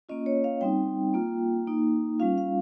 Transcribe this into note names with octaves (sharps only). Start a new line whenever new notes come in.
A#3 C#4 F4 D#5
C#5
F5
G3 C4 D#4 G5
A#3 F4
A#3 D#4
G3 C#4 F4 F5
F5